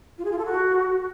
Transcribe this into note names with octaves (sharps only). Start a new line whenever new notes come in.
F4
G#4
F4
A4
F#4